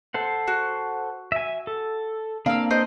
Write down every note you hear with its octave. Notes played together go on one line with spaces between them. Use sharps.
A4 C5 F#5
F#4
E5 G#5
A4
A#3 C4 D4 F5 E6
C5 D#5